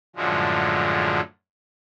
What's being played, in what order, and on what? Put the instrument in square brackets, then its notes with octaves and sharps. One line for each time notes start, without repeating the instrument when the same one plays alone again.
[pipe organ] F#2 A2 D3 F3 F#3 G#3